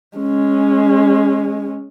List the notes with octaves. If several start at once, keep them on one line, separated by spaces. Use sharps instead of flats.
G#3 C#4